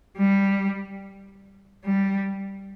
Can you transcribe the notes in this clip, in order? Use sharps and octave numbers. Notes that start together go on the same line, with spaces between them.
G3
G3